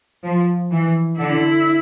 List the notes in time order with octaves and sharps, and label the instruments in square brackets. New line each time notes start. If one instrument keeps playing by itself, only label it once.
[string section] F3
E3
[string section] D3 [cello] E4